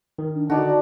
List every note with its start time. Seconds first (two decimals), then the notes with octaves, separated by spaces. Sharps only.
0.19 D#3
0.35 D4
0.50 D3 D#4 F#4 D5 A5